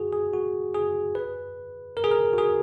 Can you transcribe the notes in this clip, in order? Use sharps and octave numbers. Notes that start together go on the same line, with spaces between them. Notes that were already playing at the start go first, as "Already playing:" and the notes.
Already playing: F#4 G#4
G#4
F#4
G#4
B4
A#4
G#4
A#4
F#4
G#4